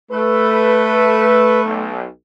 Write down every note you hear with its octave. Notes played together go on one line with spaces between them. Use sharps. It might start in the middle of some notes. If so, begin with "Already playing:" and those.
A3 B4
B1